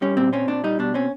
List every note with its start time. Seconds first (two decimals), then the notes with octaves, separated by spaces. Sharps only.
0.02 G3 C#4
0.17 A#2 C4
0.33 C4 C#4
0.48 A#2 D4
0.64 G3 D#4
0.79 B2 D4
0.94 C4 C#4